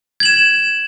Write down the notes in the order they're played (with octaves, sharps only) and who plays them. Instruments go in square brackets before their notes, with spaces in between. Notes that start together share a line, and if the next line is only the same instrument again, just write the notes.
[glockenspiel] G#6
F#7
E7